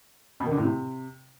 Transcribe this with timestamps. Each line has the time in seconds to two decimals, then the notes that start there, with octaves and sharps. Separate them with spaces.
0.40 B2
0.46 D#3
0.51 D3
0.57 A2
0.63 C3